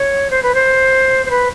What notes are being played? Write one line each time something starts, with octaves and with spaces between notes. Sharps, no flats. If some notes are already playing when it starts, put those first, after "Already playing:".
Already playing: C#5
C5
B4
C5
C5
B4